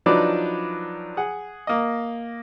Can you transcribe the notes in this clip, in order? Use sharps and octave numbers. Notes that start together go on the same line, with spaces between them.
F3 F#3 D4 D#4 B4 D5
G#4 F#5
A#3 D#5